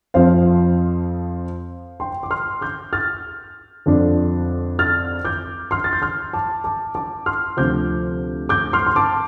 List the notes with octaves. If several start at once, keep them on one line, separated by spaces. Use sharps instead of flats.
F2 F3 C4 C5 F5
G5 C6
D6
C6 F6
D6 G6
F6 A6
F2 D3 F3 D4
F6 A6
D6 G6
C6 F6
A6
G6
C6 F6
A5 D6
A5 D6
A5 D6
C6 F6
D2 C3 F3 D6 G6
D6 G6
C6 F6
C6
A5 D6